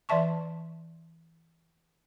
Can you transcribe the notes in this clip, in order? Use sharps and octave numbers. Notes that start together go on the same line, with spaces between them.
E3 D5 E5 A5 C#6